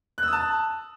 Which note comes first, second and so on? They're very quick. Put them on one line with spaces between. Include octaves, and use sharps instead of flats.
F#6 E6 D#6 A5